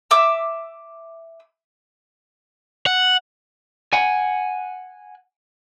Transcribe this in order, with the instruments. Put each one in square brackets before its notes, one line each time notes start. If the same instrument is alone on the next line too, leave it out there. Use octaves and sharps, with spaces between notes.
[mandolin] E5 D6 E6
[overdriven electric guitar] F#5
[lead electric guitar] F#5 G#5